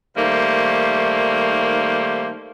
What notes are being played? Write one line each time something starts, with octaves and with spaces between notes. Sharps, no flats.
D#3 G3 A3 A#3 C5